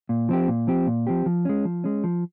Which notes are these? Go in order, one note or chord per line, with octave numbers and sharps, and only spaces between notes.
A#2
F3 C4 G4
A#2
F3 C4 G4
A#2
F3 C4 G4
F3
G#3 C#4
F3
G#3 C#4
F3